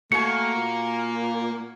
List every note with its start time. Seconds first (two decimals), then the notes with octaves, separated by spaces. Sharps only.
0.12 A3 A#3 F#4 G#5 C#7
0.55 A#2